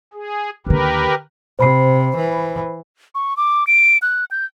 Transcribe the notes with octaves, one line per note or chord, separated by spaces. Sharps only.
G#4
D#2 D3 G4 A#4 B4
C3 C5 B5 C7
E3
C#6
D6
D7
F#6
G6